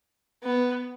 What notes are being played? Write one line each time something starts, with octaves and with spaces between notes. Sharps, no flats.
B3